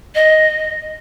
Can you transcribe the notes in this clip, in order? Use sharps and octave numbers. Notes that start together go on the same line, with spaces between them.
D#5